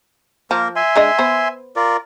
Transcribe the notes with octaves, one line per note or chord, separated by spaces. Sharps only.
F3 A#3 A#4
E5 G#5 C6
G#3 D4 D#5
B3 C5
F4 A#4 D5